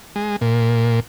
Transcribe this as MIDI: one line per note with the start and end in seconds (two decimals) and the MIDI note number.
0.16 0.36 56
0.41 1.00 46